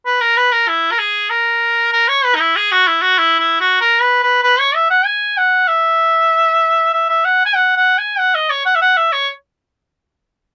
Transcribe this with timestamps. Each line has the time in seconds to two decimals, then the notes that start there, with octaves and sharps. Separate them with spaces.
0.06 B4
0.21 A#4
0.37 B4
0.52 A#4
0.68 E4
0.91 A#4
0.98 G#4
1.30 A#4
1.93 A#4
2.08 C#5
2.25 B4
2.35 D#4
2.40 E4
2.56 G#4
2.71 F#4
2.87 E4
3.02 F#4
3.18 E4
3.39 E4
3.60 F#4
3.81 A#4
4.01 B4
4.23 B4
4.43 B4
4.59 C#5
4.75 E5
4.91 F#5
5.05 G#5
5.37 F#5
5.68 E5
6.93 E5
7.09 E5
7.25 F#5
7.46 G#5
7.55 F#5
7.77 F#5
7.98 G#5
8.19 F#5
8.35 D#5
8.50 C#5
8.66 F#5
8.76 E5
8.81 F#5
8.97 E5
9.12 C#5